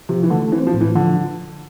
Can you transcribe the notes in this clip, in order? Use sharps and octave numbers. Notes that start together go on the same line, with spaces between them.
C3 F3
E3
D3 A3
E3 C4
F3
A2
E3
D3 F3